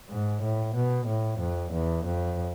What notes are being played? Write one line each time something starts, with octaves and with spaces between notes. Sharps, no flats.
G#2
A2
B2
A2
F2
E2
F2